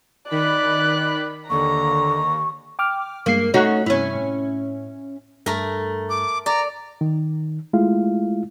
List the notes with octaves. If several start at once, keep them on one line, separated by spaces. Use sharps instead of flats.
D#3 D5 B5 F#6
D#2 D3 A#5 C#6
G5 D6 F6
G2 G#3 A#3 C7
A3 C#4 D#4 F#4 F#6
G2 C3 C#4 E4
A2
G2 A3 A#4
D6
D5 A#5
D#3
G#3 A3 E4 F4 F5